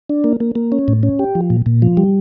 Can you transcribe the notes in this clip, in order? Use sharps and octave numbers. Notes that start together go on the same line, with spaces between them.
D4
A#3
A#3
A#3
C#4
A2
C#4
G4
F3
A#2
A#2
F3
G3